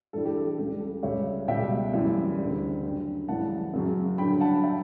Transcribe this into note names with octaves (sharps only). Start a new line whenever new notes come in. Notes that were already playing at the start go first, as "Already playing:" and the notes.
G2 E3 G3 A4
G4
A4
C#2 C#3 G3 G4
A4
C#2 C#3 G3 C#5 E5
C#2 B2 G3 E5 G5
F#2 E3 G3
D2 C#3 G3
F#2 D3 F#3
F#2 C#3 E3 G3 F#5 A5
F#2 C#3 F#3
G2 D3 F#3 G5 B5
F#5 A5
F#3 E5 G5